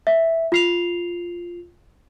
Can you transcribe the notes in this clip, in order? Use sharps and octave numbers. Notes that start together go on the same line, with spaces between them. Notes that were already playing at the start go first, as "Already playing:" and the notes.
E5
F4 C7 F7